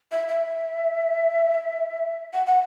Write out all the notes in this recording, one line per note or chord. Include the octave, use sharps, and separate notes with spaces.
E5
E5
F#5
F#5